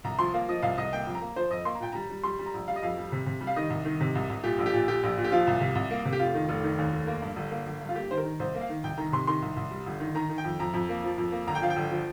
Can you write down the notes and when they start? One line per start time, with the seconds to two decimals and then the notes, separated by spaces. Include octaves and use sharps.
0.04 C2 A#5
0.19 F3 C6
0.33 A#3 F5
0.48 F3 D#5
0.62 C2 F5
0.78 C2 D#5
0.93 A#3 G5
1.07 F2
1.15 A#5
1.21 A#3
1.36 F3 C5
1.51 F2 D#5
1.65 A#3 C6
1.75 A#5
1.80 A#2 G5
1.92 G3 A#5
2.10 G3
2.24 G3 C6
2.39 G3
2.46 A#5
2.54 A#1
2.68 G3 F5
2.76 D#5
2.82 F2 F5
2.98 G3
3.12 C3
3.26 C3
3.41 G3
3.47 F5
3.56 D#3 D#5
3.70 C2
3.85 D#3
4.01 C3
4.15 C2
4.30 C2
4.44 A#2 G4
4.58 A#1
4.66 G4
4.73 A#2
4.88 A#2 G4
5.03 A#1
5.18 A#2
5.24 G4
5.31 F3 F4
5.47 C2
5.61 C3
5.75 C2
5.91 A#3
6.05 C3
6.13 G4
6.19 F1 F4
6.35 D#3
6.49 F1
6.64 D#3
6.78 D#2
6.92 F1
7.07 A#3
7.22 G2
7.36 G1
7.51 A#3
7.66 G1
7.81 G2
7.89 F4
7.95 A#3 G4
8.11 D#3 C5
8.17 A#4
8.25 D#3
8.39 C2 C5
8.55 A#3
8.61 F5
8.69 D#3
8.84 C2 G5
8.98 D#3 A#5
9.12 C3 C6
9.27 D#3 C6
9.42 C2
9.56 C2
9.71 G3
9.86 G1
10.00 D#3
10.15 D#3 A#5
10.29 D#3
10.38 G5
10.44 F2
10.59 F2 A#5
10.74 F2
10.89 A#3
11.04 F3
11.18 F2
11.32 A#3
11.47 G1 A#5
11.55 G5
11.62 F3 F5
11.70 G5
11.76 G1
11.91 F3